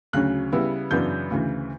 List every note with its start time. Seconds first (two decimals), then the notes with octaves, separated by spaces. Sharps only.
0.13 D2 C#3 F#3 C#4 F#6
0.52 C#3 G3 B3 E4
0.91 F#2 C#3 E3 B3 D4 G6
1.30 D2 C#3 E3